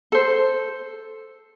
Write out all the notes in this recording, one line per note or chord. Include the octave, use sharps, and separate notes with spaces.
A4 C5